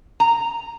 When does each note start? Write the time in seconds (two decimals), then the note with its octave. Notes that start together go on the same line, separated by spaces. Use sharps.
0.20 A#5